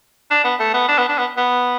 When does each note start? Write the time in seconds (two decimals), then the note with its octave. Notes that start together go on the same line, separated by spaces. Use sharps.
0.31 D4
0.44 B3
0.59 A3
0.74 B3
0.88 D4
0.98 B3
1.09 D4
1.18 B3
1.37 B3